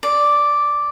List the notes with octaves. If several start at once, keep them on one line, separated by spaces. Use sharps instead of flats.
D5